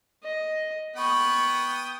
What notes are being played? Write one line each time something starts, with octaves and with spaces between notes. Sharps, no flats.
D#5
B3 G5 B5 C#6 D#6